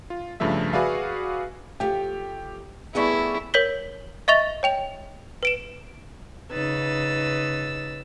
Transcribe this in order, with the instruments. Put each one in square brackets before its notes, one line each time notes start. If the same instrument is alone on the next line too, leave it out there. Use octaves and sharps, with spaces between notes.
[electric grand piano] F4
G2 C#3 F3 A3 E5
F#4 G#4 B4 D5 E5 F5
[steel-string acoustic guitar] F3 A3 [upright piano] G4
[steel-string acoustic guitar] G3 A3 G#4 [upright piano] B3 D5 C#6 [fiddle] E4
[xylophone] A#4 C#5 G6 B6 G7
D#5 E5 C#6 A6 F7
C#5 G5 F7
B4 D7 E7
[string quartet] C#3 D#4 B4 E6 A6